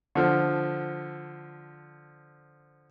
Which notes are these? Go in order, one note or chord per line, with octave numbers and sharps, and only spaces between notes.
D3 F3